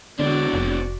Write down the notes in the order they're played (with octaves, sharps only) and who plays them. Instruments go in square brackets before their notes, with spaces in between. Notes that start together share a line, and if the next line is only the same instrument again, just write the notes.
[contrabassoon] E1 [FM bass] D3 [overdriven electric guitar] C4 D4 [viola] F#4 D5
[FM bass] F1